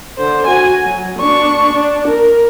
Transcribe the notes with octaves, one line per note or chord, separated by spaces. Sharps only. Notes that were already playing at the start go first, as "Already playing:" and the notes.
D3 C5
F#4 G#5
F#3
D4 C#6
D4
A#4